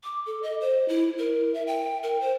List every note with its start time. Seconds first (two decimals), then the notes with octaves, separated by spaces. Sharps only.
0.04 D6
0.26 A4
0.43 D#5
0.61 C5
0.89 E4
1.18 A#4
1.54 E5
1.67 G5
2.03 A#4
2.21 C5